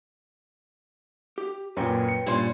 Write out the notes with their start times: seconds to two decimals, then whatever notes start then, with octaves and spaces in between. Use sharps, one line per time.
1.38 G4
1.77 F#2 A#2 B4 C#5 G5
2.09 C#7
2.26 G2 A#2 G3 C#4 C6